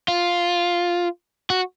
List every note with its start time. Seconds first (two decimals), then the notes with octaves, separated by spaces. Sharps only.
0.08 F4
1.50 F#4